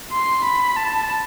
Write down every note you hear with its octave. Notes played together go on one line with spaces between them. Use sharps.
C6
B5
A5